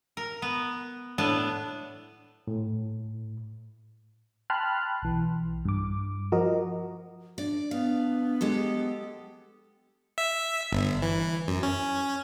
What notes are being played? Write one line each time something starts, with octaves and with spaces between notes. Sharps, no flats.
A#4
B3
A2 B3 D4 A5
A2
G5 A5 B5 C6 F6 F#6
B1 E3
G2 D6
F3 F#4 A#4 D#5
D4 D5
B3 F5
G#3 G4 A4
E5
G1
E3
F#2
C#4